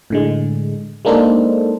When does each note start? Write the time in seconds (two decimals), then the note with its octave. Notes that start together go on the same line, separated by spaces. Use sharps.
0.10 A2 D3 G#3
1.05 G#3 A#3 D4 D#4 A4 C5